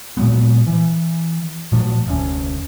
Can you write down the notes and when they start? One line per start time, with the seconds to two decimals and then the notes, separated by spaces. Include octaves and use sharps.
0.17 A#2 F#3 G#3 B3
0.66 E3
1.72 A#2 F3 F#3 A3
2.07 F1 D2 C#4